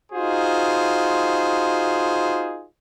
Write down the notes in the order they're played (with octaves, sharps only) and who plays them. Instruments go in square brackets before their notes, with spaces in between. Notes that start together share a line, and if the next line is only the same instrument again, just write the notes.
[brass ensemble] D#4 F4 F#4 G#4 C5